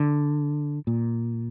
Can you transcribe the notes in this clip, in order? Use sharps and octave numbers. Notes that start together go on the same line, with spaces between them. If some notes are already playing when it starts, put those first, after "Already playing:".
Already playing: D3
A#2